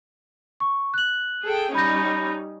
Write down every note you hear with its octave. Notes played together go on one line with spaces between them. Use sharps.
C#6
F#6 F#7
G#4 A4 G5
G3 C#4 D#4 B5 G6 A#6